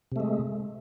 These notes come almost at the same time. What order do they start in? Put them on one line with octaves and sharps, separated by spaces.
C3 A3 G#3